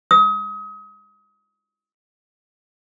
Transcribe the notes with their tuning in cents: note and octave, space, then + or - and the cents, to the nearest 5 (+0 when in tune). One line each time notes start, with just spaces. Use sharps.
D#6 +35